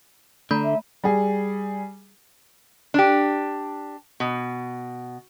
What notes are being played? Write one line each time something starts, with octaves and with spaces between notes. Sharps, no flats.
D3 A3 A#5 B5
E5
G3 G#4
D4 G4
B2